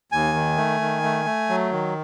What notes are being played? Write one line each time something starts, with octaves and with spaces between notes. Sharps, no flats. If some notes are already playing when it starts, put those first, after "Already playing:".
D#2 G#5
D#3
A3
D#3
A3
A3
F#3
D#3